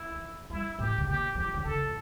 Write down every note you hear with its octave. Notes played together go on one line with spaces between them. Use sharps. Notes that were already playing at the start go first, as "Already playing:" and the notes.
Already playing: E4
E3
G3 E4
A2 G4
C#3
A#2 G4
F3 G4
E3
D3
C#3 A4
A2